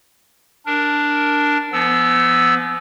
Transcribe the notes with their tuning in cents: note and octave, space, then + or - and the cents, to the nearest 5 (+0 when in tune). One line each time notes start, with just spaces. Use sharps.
D4 +0 A#4 +0
F3 -40 B3 +0 E6 +0